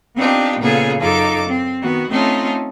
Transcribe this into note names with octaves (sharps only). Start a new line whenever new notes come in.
B3 C4 D4 D#4 F4 G4
A#2 C#3 B3 F4 G#4 A4
F#2 D#4 F4 A4 D6
C4
D#3 B3 F#4
A3 C4 C#4 D#4 F4 A4